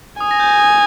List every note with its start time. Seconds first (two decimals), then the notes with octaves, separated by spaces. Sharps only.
0.21 G#5 D#6
0.31 A#6
0.40 G6
0.49 A#6
0.59 D#6